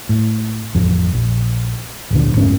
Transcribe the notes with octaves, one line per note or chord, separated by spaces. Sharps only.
A2
A1 F2
A#1
D1 A#1 D3
A1 F2 G#2 C#4